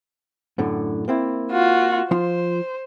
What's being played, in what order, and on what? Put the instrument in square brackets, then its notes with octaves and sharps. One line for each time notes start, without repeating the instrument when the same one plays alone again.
[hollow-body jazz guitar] F#2 A2 D3
A#3 C4 E4
[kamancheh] F4 F#4
[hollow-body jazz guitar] F3 F4 C6 [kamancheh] C5